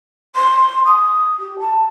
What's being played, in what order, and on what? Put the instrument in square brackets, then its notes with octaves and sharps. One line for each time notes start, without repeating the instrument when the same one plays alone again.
[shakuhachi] C6
D#6
G4
A5